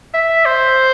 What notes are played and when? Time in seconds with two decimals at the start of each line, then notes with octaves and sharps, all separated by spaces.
0.14 E5
0.46 C5